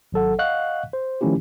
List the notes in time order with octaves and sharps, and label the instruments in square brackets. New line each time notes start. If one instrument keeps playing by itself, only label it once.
[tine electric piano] G#1 F#3 A4 F#5
D#5 F5 F#5 C#6 F#6
C5
D#3 F3 A3 C#4 E4 G4